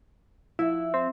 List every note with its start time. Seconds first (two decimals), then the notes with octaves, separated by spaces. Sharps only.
0.59 F3 E4 E5 F#5
0.94 C4